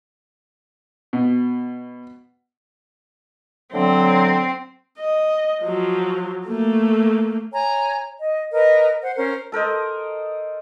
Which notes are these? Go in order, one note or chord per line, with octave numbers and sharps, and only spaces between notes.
B2
A2 D3 F#3 C4
D#5
F3 F#3
A3 A#3
C#5 G#5 A#5
D#5
A#4 B4 D#5
C5 F#5
C#4 A#4 C5
A4 A#4 C5 D#5